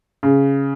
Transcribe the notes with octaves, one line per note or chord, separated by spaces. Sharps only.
C#3